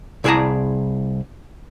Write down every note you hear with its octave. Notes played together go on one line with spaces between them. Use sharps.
C2 E4 G#4 D5 A5 A#5